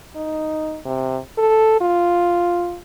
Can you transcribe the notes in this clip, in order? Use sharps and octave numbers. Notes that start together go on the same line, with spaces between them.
D#4
C3
A4
F4